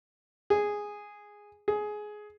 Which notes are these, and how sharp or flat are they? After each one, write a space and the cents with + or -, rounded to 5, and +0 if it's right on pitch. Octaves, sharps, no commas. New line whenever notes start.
G#4 -5
G#4 +15